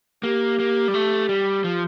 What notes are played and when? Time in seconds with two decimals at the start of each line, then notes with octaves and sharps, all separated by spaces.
0.23 A#3 G4
0.59 A#3
0.88 G3
0.94 A3
1.29 G3
1.64 F3